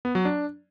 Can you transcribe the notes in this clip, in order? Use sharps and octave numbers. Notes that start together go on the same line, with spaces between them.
B3
F#3
D4